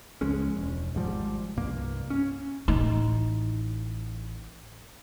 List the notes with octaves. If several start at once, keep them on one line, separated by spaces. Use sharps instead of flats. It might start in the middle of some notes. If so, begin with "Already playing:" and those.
C#2 F3 G#3 C#4
E1
G#1 G#2 F3 G3
C2 G2 A#3
C#4
A1 D#4